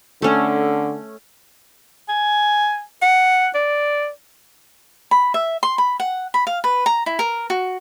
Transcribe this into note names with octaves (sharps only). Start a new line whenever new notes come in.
D3 A3 C#4
G#5
F#5
D5
B5
E5
C6
B5
F#5
B5
F5
B4
A#5
E4
A#4
F#4